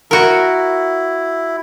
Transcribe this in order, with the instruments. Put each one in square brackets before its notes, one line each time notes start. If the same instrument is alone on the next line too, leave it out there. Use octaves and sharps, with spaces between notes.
[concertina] E4 [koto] F#4 A#4